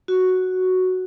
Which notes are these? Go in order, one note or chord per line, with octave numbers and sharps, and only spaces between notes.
F#4